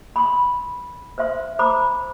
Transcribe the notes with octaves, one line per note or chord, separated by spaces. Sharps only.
B5 C6
B4 C5 E5 C6
C5 A#5 B5 D6